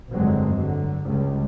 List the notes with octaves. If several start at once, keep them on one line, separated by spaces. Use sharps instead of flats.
F1 G2 D3 F#3 G#3 C4
D3 F#3
C#2 C#3 G3